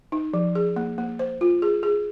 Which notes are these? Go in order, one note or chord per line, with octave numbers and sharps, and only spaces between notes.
D#4
F3
G#4
A#3
A#3
C5
F4
G#4
G#4